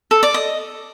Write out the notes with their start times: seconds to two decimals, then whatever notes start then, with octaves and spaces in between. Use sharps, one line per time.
0.11 A4
0.23 D5
0.34 D#5